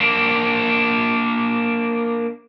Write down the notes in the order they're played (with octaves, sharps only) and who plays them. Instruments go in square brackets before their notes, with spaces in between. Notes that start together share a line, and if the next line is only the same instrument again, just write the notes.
[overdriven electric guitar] A#3 D4